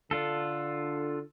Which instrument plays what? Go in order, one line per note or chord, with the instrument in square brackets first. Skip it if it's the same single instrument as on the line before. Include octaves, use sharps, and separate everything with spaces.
[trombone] D3 [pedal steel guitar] D4 F4 A4